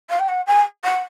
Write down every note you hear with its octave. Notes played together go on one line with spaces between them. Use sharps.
F5
G5
F#5
G#5
F#5